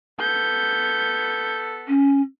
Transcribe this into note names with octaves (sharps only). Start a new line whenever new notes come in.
B3 A4 G6
C#4